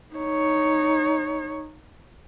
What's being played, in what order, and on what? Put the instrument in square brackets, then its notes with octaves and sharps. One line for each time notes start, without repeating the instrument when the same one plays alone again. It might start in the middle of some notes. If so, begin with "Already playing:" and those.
[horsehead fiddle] D#4 C#5